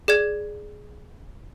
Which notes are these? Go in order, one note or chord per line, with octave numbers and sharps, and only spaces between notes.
G#4 D5 G#6